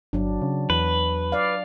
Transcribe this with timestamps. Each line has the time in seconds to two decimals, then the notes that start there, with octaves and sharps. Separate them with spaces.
0.13 G1 F#3 D4
0.42 C#3
0.70 E2 B4
1.32 D5 F5